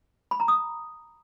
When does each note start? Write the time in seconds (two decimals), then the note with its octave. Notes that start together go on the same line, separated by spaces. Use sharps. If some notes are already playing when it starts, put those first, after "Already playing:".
0.31 B5
0.40 A#5
0.48 D#6